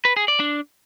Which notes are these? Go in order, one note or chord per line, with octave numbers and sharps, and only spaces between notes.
B4
G#4
D5
D4